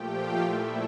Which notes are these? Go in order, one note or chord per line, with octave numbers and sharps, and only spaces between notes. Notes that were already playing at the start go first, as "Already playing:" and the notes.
Already playing: A#2 F3 A3 G4 G5
F4 F5
A#2 A3 E4 E5